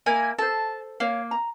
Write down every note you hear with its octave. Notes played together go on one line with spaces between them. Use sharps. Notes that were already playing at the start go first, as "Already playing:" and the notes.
A#3 E4 A#4 G#5
A4 C5 A5
A#3 C#5 F5
A#5